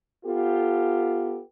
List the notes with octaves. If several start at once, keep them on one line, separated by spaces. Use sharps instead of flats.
B3 F4 G4 A4